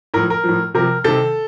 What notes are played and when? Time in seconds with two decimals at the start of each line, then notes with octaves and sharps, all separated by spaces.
0.14 A2 F3 A#4
0.30 A#4
0.44 A2 F3
0.74 C3 F3 A#4
1.04 C3 D#3 A4